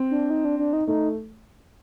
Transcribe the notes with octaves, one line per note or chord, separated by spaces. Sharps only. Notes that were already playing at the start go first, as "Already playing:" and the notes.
Already playing: C4
D4
D#4
D4
D4
D#4
A3 D#4